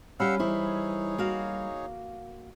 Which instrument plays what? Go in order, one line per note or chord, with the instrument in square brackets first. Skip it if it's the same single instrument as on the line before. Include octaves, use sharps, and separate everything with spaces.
[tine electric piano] G3 B5 F6 [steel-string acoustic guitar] C#4 G4 [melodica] F5 F#5 E6
[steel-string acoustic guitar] E3 E4 C5 [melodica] D#4 G#4 C#5
[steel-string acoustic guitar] A#3 F#4 F5